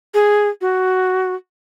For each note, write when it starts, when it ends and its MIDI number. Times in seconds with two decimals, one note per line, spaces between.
0.14 0.49 68
0.61 1.35 66